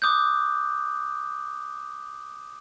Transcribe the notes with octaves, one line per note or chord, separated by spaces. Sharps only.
D6 D#6 F#6 G6